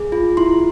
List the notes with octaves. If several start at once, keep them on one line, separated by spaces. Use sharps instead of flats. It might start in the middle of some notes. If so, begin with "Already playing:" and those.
Already playing: G#4
F4
E4 C6